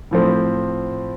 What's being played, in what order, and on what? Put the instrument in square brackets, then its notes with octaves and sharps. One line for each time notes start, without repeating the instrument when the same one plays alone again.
[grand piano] A2 F3 C4